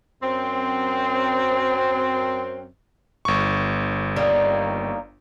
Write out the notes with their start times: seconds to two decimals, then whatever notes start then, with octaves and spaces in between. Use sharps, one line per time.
0.23 F#2 C4
3.25 G1 C#6
4.16 D#3 G3 A#3